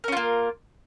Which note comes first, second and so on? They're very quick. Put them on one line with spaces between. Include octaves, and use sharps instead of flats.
A#4 C#4 F4 A#3